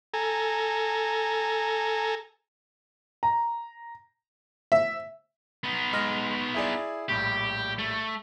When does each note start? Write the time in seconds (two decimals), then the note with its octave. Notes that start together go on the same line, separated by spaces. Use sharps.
0.14 A4 G#5 A#5
3.23 A#5
4.72 E5
5.64 B3 D#4
5.93 G#3 F6 A#6
6.54 E4 G#4 D5
7.09 A#1 A2 G3 G4
7.79 A3